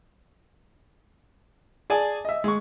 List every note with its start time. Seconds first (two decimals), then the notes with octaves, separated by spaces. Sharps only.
1.90 G#4 D5 G#5 A5
2.25 D#5 E5
2.44 G#3 C#6